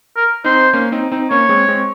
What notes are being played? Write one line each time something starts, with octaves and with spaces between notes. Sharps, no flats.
A#4
C4 D#4 C5
A#3 C#4
C4 D#4
C4 D#4
A#3 C#4 C#5
G#3 C4
G#3 C4